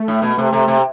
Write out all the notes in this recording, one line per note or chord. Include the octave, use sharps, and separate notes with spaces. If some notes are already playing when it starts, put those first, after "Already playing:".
Already playing: A3
A2
B2
C3 A3
C3
C3